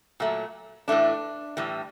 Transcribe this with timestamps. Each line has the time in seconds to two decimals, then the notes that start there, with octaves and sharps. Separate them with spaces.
0.20 A#2 F#3 A3
0.88 A2 E3 A3 D4
1.57 A2 E3 G3